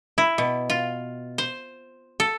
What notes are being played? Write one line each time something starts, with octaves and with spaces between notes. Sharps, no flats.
E4
B2
F4
C5
A4